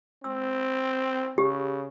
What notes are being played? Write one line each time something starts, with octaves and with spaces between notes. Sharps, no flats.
C4 E6
C#3 G4